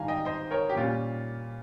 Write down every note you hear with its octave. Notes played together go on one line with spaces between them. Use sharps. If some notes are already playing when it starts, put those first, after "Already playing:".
Already playing: G#2 D#3 G3 F5 G#5 A#5
D#5 G5
C5 D#5
A#4 C#5
G4
A#2 G3 C#4 F4